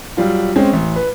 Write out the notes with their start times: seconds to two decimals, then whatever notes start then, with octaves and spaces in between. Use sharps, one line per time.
0.17 F#3 G3 F4
0.56 G#3 C4 C#4
0.73 A1
0.96 B4